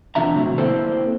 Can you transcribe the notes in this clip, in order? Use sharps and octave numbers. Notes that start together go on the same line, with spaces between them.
E2 C3 F3 D4 E5 A#5
A2 C3 D#3 F#3 C4
A#3 C4 E4 A4 C5 A5